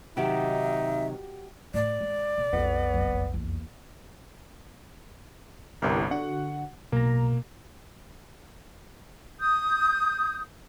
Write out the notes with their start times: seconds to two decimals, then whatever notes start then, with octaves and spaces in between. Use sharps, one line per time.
0.17 C3 D#3 F#3 D#4 F#4 G4 E5
1.74 A2 D5
2.01 G#3
2.38 B2
2.53 B1 F2 F3 B3 F4
2.94 F#1 F#3
3.34 E2 A#3
5.82 G1 C2 E4 G4 A#4
6.11 D3 F#4 F#5
6.92 B1 B2 A#3 A#5
9.39 D#6 G6